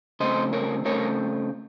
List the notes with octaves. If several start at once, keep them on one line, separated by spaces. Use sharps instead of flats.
C#3 A3 C4 C5 D#5
A#4 C#5
C#3 A3 C4 A#4 C#5